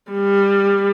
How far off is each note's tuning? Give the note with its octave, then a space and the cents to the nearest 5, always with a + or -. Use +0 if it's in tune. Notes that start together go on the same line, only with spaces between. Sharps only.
G3 +25